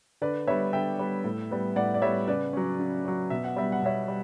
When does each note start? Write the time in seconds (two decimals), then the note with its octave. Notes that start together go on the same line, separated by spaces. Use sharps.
0.21 D3 B4 D5
0.47 G3 B3 C#5 E5
0.73 D3 E5 G5
0.99 G3 B3
1.24 A2
1.51 G3 B3
1.76 A2 D5 F#5
1.94 D5
2.02 G3 B3 C#5 E5
2.28 C#3 B4 D5
2.53 F#3 C#4
2.80 C#3
3.05 F#3 C#4
3.30 B2 E5
3.44 F#5
3.56 G3 B3 E5
3.72 F#5
3.82 B2 C#5 E5
4.08 G3